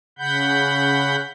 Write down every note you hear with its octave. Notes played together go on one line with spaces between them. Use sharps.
C#3 F#5 B5 G6